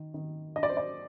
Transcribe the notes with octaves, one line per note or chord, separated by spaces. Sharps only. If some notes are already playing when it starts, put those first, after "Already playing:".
Already playing: D#3
D#3
D4 D#5
D5
C5
D5